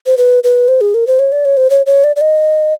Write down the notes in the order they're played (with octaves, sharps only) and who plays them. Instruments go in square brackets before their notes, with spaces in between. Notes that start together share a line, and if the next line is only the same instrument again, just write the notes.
[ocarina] C5
B4
B4
C5
G#4
A#4
C5
C#5
D5
C#5
C5
C#5
C#5
D5
D5
D#5